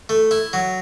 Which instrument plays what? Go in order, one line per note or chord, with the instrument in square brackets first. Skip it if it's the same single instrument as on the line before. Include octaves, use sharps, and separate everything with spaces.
[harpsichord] A3
E4
F#3